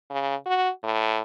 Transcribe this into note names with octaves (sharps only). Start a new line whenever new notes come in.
C#3
F#4
A2